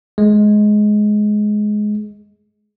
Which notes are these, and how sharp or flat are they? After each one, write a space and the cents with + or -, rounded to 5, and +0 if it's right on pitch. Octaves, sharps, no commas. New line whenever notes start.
G#3 +15